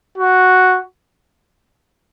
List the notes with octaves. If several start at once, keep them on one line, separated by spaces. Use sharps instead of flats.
F#4